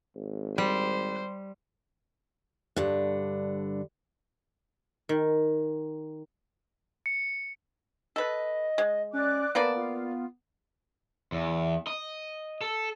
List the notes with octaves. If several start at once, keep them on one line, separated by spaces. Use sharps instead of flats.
G#1
G3 C5
G2 D3
D#3
C#7
A4 B4 D#5
G#3
C#4 D5 D6 F#6
A#3 B3 B4 D5 A5
F4
E2
D#5
A4